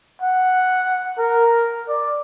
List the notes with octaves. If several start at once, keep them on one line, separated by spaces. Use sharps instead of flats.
F#5
A#4
D5